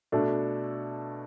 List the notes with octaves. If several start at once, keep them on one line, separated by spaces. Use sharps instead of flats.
B2 A3 D4 A4